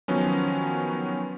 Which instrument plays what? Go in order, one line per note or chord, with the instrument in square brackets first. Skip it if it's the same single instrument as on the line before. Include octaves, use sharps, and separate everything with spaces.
[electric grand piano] D#3 F3 F#3 B3 C#4